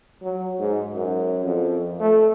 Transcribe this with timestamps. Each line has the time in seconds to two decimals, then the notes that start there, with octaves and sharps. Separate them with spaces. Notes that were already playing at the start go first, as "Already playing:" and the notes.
0.22 F#3
0.59 G#2
0.95 F#2
1.44 F2
2.00 A3